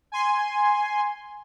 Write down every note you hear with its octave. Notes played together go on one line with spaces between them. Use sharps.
G#5 C6